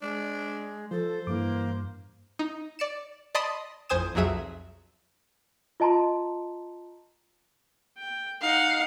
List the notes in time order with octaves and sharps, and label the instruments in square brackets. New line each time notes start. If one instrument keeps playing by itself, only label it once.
[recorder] G#3 [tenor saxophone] D4
[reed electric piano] F3 [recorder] A4 [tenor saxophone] C5
[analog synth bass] G2 [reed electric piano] E3 D6 [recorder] A#3
[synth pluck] D#4
D5 C#7 E7
D5 D#5 A5 B5 C6 D#6
A1 F2 C5 G#5 D#6 E7
B1 F2 F#3 G#4 E5 D#7
[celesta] F4 D#5 A5 A#5 C6
[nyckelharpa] G5
[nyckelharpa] D#4 F#5 [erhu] F5